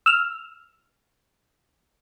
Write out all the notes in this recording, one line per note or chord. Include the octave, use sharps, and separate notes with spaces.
E6 F6